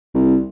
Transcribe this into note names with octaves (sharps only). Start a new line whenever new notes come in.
C2